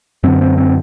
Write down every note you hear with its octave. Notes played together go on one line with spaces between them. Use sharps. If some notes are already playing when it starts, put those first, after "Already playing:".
F#2 D3 C4
C4
C4